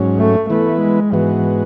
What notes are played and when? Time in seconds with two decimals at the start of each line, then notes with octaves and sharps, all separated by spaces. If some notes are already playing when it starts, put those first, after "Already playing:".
Already playing: G#2 F#3 C#4
0.18 A3
0.49 E3 A3 B3 E4 B4
0.81 G#3
1.12 G#2 E3 G#3 B3 F#4